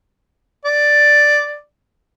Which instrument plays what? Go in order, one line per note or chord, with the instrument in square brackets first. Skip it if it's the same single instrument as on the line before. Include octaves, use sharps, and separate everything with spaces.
[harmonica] D5